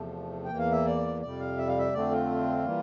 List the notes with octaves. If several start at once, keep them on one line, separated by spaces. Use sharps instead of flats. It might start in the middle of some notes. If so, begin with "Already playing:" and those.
Already playing: E2 C3 F3 A3
G5
E2 E3 A#3
F5
E5
D5
F2 C3 G3 D5
F5
E5
F5
E5
F2 D3 A3 C4 D5
F4
E3 G3 A#3